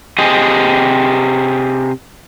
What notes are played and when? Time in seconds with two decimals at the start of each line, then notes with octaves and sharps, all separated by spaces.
0.18 C3 G4 G#4 D#5